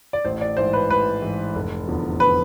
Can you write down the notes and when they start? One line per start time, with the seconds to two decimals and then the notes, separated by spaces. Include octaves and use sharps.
0.13 D5
0.25 A1 C5
0.41 D5
0.57 G#2 E3 C5
0.73 B4
0.90 A1 B4
1.22 G#2 E3
1.55 F1
1.88 E2 D3 F3
2.20 B4